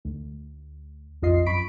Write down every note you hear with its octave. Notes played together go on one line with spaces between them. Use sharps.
D2
B1 F2 F4 D#5 C7
F#2 B5 C#6 B6 D7